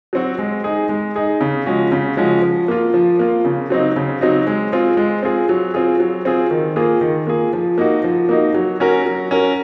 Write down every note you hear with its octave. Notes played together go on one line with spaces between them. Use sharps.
F#3 C4 F#4
G#3
D#4 G#4
G#3
D#4 G#4
C#3
F3 G#3 C#4 F#4
C#3
F3 G#3 C#4 F#4
F3
A#3 F4
F3
A#3 F4
C#3
F#3 C4 D#4
C#3
F#3 C4 D#4
G#3
C4 F4 G#4
G#3
C4 F4 G#4
F#3
C4 F4 G#4
F#3
C4 F4 G#4
D#3
A#3 F4 G#4
D#3
A#3 F4 G#4
F3
A#3 D#4 F#4
F3
A#3 D#4 F#4
F#3
C#4 F#4 A#4
F#3
C#4 F#4 A#4